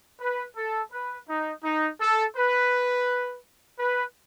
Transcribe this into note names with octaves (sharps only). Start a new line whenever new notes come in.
B4
A4
B4
D#4
D#4
A4
B4
B4